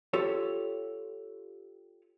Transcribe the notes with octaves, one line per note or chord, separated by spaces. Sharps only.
F4 G4 A4 C#5